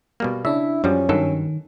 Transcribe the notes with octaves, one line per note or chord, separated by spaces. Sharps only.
B2 G3 A#3
C#3 D4 E4 E5
F#2 F3 G3 C#4
G2 D#3 F#3 A4